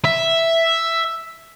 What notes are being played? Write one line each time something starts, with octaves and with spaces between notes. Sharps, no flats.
E5